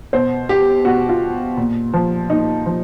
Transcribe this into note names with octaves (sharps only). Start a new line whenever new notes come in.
B2 C5
G4
B2 F#4
F4
A#2
F3
A#2 D#4
F3